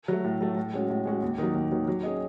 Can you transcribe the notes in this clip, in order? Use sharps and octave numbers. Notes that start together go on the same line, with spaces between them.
F#3 A3
A2
F#3 A3
A2
G#3 C#4 F#4
A2
G#3 C#4 F#4
D#2
D#3 F#3
D#2
D#3 F#3
F#3
C#4 G#4 D#5